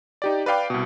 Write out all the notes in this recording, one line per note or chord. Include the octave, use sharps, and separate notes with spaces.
D#4 G4 D5
B4 D5 F5 G5 D6
C2 B2